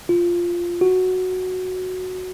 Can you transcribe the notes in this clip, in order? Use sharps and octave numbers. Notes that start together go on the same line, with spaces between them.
F4
F#4